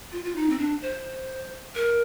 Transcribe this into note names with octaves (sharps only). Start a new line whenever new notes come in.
F4
F4
D#4
C4
D4
C5
A#4